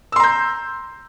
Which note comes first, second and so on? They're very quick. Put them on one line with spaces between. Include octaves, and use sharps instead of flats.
E6 C6 A#5 G6